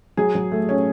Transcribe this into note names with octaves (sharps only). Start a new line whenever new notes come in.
F#3 G#4
F#3
A3
C#4